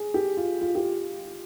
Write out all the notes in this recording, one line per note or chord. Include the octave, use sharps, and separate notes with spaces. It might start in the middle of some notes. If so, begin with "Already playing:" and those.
Already playing: G#4
G4
F4
F4
G4